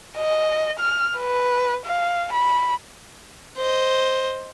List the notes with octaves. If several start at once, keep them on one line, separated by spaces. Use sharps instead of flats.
D#5
F6
B4
F5
B5
C5 D#5